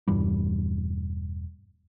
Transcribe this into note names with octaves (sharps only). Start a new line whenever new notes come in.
E1 G2 E3 G3